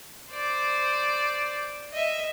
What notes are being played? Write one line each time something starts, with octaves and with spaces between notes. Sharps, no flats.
C5 D5
D#5 E5